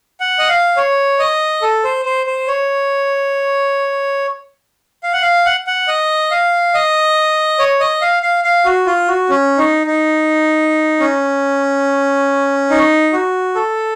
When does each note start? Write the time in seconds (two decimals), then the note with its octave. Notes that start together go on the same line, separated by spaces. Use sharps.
0.20 F#5
0.39 D#5
0.49 F5
0.77 C#5
1.19 D#5
1.62 A4
1.84 C5
2.05 C5
2.27 C5
2.48 C#5
5.03 F5
5.13 F#5
5.22 F5
5.46 F#5
5.67 F#5
5.88 D#5
6.31 F5
6.74 D#5
7.59 C#5
7.80 D#5
8.02 F5
8.23 F5
8.44 F5
8.65 F#4
8.87 F4
9.08 F#4
9.29 C#4
9.58 D#4
9.87 D#4
11.00 C#4
12.70 D#4
13.13 F#4
13.55 A4